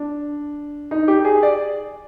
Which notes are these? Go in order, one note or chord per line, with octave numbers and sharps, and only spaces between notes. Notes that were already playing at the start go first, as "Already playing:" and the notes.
Already playing: D4
D#4
G4
G#4
D5